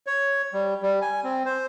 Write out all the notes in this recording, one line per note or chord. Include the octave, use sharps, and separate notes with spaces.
C#5
G3
G3
G#5
C4
C5